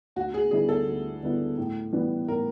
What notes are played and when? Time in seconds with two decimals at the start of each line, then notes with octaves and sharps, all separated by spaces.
0.16 D2 F#4
0.34 G#4
0.51 D3 G3 B3 E4 G#4
0.69 A4
0.87 D2
1.23 D3 G3 B3 E4
1.58 A2
1.93 E3 G3 B3
2.28 A2 A#4